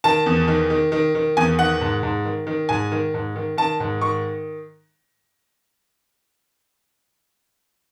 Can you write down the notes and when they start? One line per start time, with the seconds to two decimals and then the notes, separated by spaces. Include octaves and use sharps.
0.04 D#3 A5
0.26 E2
0.48 D#3
0.70 D#3
0.92 D#3
1.15 D#3
1.37 E2 G#5
1.59 D#3 F#5
1.81 G#2
2.03 G#2
2.25 D#3
2.47 D#3
2.69 G#2 G#5
2.92 D#3
3.14 G#2
3.36 D#3
3.57 D#3 A5
3.80 G#2
4.01 D#3 C#6